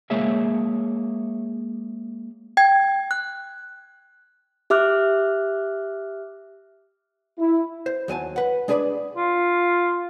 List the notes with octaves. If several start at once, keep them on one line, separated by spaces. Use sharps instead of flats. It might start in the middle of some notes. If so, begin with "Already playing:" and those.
G#3 A#3 G#4 C#5 E5 F5
G5 G#6
F#6
G4 E5 D6 F6 F#6
E4
C5
D#2 F#3 G#5 A5
B4 F#5
G#3 D4 G#4 B4 C#5 D5
F4